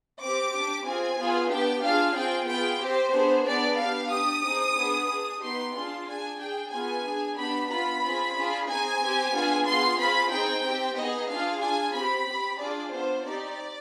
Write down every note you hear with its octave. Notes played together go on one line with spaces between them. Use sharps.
C4 G4 D6
D4 G4
C4 F4 G#4 G#5
B3 F4 G#4
B3 D4 G4 G5
D4 F4 G#4 F5
C4 F4 G#4 G5
B3 F4 G#4 G5
C4 G4 C5
B3 D4 G#4
B3 D4 G#4 D5
B3 D4 G4 F5
D4 G4 D#6
C4 D#4 G#4
B3 D4 G#4
D4 G#4
B3 D#4 G4 C6
D4 F4 G#4 C6
D4 G#4 G#5
D4 G#4 G5
B3 F4 G#4 G#5
D4 G#4
B3 D4 G4 B5
B3 D4 F4 B5
C4 F4 G#4
D4 F4 G#4
C4 D#4 G#4 G#5
C4 G4
B3 D4 F4 G#4
B3 F4 G#4 C6
C4 F4 G#4 B5
C4 D#4 G#4 G5
C4 G4
B3 D#4 G#4 D#5
D4 F4 G#4 F5
D4 F4 G#4 G#5
C4 G4 B5
C4 G4
D4 F4 G#4 D5
B3 D4 F4 C5
C4 D#4 G4 D5